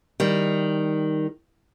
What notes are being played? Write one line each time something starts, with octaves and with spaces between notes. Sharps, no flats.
D#3 G3